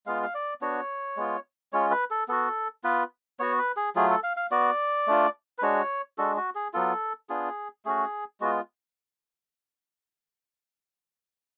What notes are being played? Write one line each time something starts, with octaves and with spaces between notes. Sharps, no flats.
G#3 B3 F4 F5
F5
D5
B3 D4 F#4 C#5
G#3 B3 F4
G#3 C#4 F4 C#5
B4
A4
B3 F#4 A4
B3 F4 B4
B3 F#4 C#5
B4
G#4
F#3 A3 F4 G#4
A4
F5
F5
B3 F#4 D5
A3 D4 F4
B4
G#3 D4 F#4 C#5
G#3 D4 F#4 A4
F#4
G#4
F#3 B3 F4 A4
B3 D4 F4 G#4
A3 C#4 F#4 G#4
G#3 B3 F4 F#4